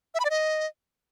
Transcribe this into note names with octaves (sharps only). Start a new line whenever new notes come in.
E5
B5
D5
D#5